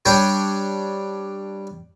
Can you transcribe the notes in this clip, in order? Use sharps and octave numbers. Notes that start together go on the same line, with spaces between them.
G3 D4 C#5 G5